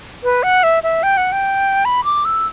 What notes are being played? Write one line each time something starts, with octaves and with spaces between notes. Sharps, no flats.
B4
F#5
E5
E5
G5
F#5
G5
B5
D6
E6